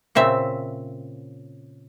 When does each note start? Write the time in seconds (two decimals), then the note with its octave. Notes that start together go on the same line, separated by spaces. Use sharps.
0.15 A#2 C#3 C4 E5